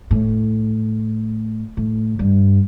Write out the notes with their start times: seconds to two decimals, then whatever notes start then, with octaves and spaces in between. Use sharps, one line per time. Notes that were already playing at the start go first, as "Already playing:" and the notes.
0.11 A2
1.77 A2
2.19 G2